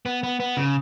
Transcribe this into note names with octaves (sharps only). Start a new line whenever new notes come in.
B3
B3
B3
C#3